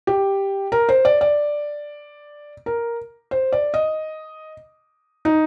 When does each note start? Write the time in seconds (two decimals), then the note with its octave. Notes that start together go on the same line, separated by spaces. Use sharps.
0.07 G4
0.72 A#4
0.89 C5
1.05 D5
1.21 D5
2.66 A#4
3.31 C5
3.52 D5
3.74 D#5
5.25 D#4